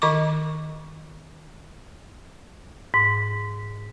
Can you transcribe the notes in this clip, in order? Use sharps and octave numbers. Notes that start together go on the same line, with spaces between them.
D#3 D#5 C#6 D6
G#2